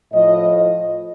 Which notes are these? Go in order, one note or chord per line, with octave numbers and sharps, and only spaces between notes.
A2 F3 D#5
D#5